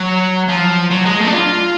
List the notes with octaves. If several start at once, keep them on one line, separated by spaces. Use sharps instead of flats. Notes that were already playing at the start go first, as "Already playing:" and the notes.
Already playing: F#3
F3
F#3
G#3
A3
D4
F4